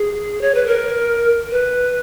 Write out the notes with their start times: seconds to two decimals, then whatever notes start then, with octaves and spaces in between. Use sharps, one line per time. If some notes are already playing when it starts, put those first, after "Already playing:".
Already playing: G#4
0.42 C#5
0.55 B4
0.67 A#4
1.51 B4